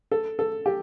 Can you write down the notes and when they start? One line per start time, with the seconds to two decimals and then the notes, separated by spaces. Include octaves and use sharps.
0.11 A4
0.39 A4
0.66 G4